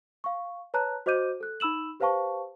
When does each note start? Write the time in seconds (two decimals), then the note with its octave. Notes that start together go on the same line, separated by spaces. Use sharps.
0.24 F5 C#6
0.74 B4 C#5 A5 A#5 F#6
1.06 F#4 C5 D#5 D6 G6 D#7
1.41 A4 F#6
1.60 D#4 B5 E6 E7 F#7
2.00 G4 B4 C5 F5 A5 C#6